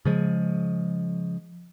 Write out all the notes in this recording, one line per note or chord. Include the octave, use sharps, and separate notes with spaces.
C#3 F3 G#3